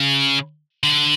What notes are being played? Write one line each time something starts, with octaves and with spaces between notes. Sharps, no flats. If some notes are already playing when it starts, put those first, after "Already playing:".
Already playing: C#3
D3